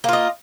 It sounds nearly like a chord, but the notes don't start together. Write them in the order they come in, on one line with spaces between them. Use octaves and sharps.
A#3 F4 D#5